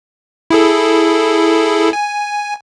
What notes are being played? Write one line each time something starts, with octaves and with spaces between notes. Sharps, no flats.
E4 G#4 A4
G#5